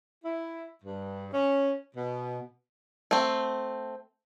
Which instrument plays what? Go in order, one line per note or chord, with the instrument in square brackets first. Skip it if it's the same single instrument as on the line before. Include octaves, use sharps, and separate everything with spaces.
[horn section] E4
G2
C#4
B2
[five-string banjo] A3 C4